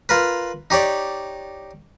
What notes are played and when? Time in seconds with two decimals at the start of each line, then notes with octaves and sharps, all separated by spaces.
0.09 F4 A#4 B4
0.70 D#4 G4 C#5 D5